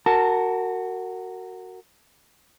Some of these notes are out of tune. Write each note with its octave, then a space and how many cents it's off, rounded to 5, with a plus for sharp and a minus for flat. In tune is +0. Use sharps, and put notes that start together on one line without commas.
F#4 +5 A#4 -25 A5 -5